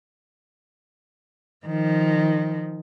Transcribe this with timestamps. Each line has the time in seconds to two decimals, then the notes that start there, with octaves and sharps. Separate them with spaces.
1.66 D#3 F3